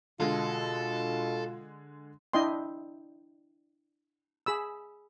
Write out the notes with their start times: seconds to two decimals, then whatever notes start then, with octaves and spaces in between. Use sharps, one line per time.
0.20 B2 D3 G#3 F4 A4
2.33 D4 E4 D#5 G5 C6
4.46 G#4 B5 E6